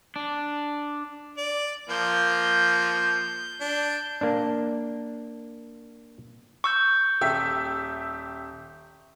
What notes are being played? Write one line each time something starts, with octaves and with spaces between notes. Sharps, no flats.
D4
D5
F3 A#3 G6
D4
A#3 D4
C#6 E6 G6
D#1 G4 E5